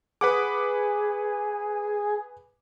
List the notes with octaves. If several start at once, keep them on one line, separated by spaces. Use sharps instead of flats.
G#4 B4 F#5 D6